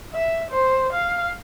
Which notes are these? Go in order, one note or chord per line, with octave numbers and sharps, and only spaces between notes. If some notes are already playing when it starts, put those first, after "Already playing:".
E5
C5
F5